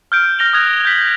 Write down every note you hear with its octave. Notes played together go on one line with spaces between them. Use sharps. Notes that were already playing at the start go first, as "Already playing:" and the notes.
F6 G6 D7
F6 G6 A#6 D7 F7 G7
D#6 F6 F#6 G#6 F7
F7
G6 B6 F#7